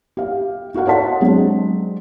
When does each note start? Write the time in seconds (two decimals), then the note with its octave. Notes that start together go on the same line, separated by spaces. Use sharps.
0.17 G4 F5
0.74 E4 F#4 A4 F5 F#5
0.87 C#5 D#5 F#5 A5 C6 B6
1.21 F#3 G#3 C4 D4 G#4